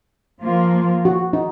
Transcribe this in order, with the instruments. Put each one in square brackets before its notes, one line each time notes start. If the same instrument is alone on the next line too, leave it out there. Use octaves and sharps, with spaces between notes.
[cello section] F3 A#3 F4
[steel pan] F#4
D#4